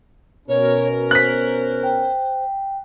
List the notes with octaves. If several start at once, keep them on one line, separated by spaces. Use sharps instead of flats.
B2 C#4 A#4 C#5
C5 F#6 B6
G5